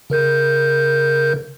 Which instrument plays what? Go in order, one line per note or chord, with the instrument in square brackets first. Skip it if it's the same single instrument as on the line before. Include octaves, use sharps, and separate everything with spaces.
[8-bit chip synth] C#3 A#4 G6